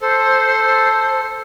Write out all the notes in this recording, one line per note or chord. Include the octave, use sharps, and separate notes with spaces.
A4 C5